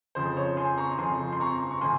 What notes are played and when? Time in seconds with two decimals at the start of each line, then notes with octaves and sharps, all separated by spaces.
0.15 F2 C#3 F3 C5
0.37 C#5
0.57 G#5 C6
0.78 A#5 C#6
0.98 F2 C#3 F3 G#5 C6
1.32 C6
1.40 A#5 C#6
1.71 C#6
1.81 C3 F3 G#5 C6